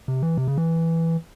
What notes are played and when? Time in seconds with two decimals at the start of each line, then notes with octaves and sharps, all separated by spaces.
0.08 C3
0.23 E3
0.37 C3
0.48 C#3
0.58 E3